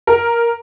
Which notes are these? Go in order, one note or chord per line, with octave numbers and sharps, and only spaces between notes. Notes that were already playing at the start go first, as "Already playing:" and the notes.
A#4